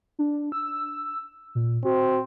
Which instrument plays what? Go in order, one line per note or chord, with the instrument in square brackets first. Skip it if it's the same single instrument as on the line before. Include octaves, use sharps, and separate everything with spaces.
[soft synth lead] D4
E6
A#2
[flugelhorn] C4 [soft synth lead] F#4